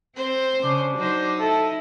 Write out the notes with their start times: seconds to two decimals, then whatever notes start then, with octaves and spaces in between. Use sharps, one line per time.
0.16 C4 C5
0.63 C#3 D4
0.97 F#3 D#4 C5
1.39 E4 A4